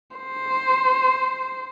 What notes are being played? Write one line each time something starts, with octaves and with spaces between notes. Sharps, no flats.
C5